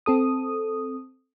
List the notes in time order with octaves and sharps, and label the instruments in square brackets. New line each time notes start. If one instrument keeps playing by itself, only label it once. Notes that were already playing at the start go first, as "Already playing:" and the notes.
[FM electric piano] C4 A4 D#6